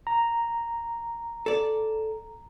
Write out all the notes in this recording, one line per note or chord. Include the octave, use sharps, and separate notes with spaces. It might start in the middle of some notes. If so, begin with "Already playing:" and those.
A#5
A4 D5